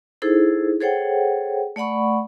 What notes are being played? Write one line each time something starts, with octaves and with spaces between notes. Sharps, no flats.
D#4 E4 G#4 A4 C5
G#4 A4 C5 C#5 F#5 G5
A3 D5 F#5 B5 C#6